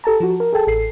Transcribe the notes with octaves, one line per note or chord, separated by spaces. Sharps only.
G4 A4 A5 A#5
F3 F#4
A#4
G#4 A4 G5 A5
A1 A4 C7